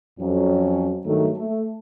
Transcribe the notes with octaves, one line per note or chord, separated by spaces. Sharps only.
F2 F#3 C#4
G2 D#3 F#3 A3
A3